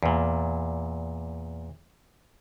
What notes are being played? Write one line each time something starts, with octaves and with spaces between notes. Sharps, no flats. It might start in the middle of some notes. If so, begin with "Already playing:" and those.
E2 A#2